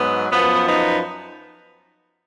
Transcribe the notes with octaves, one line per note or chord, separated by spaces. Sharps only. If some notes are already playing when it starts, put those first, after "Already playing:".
Already playing: G#2 F#3 B3
F#2 F3 B3
B3 D#4